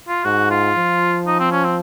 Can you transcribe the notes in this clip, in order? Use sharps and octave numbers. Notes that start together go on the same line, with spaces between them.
F4
G#2 F#4
F4
F3
D#4
C4
C#4
C4